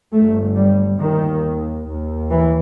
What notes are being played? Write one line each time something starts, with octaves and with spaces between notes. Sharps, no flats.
G1 G2 A3
G3
D#2 D#3
D#2
E3